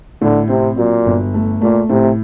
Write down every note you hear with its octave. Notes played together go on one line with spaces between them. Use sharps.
A2 D3
C3 C4
A#2 F#3
G1
A3
A#2 A3
A2 C3